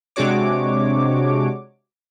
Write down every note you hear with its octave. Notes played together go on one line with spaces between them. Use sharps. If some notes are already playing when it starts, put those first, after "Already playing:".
C3 G#3 D4 F#4 C#5 D6